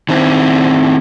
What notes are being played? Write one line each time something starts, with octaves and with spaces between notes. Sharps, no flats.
D#3 C4 E4